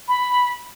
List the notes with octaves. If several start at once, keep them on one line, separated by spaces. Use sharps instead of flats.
B5